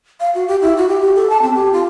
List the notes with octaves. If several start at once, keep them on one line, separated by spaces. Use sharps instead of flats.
F5
F#4
G4
E4
F#4
G4
G4
A4
A5
C4
G4
F4